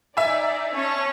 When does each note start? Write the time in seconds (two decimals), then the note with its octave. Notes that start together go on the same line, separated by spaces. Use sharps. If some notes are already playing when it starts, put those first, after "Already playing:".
0.17 D#4 D5 E5 G#5
0.74 C#4 C#5 A5 C#6